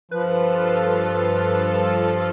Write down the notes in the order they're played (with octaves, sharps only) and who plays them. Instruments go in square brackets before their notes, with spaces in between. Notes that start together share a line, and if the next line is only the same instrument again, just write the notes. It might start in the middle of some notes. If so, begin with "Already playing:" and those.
[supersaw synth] G2 F4 A4 [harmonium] F3 [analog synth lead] B4